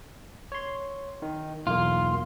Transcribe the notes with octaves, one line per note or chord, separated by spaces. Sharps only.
C#5 C6
D#3
B1 E2 A#3 F4